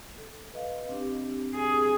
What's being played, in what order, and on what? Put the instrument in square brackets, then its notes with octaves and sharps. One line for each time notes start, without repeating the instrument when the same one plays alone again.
[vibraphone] A4
B4 D#5 F5
C4 D4 G4
[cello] G#4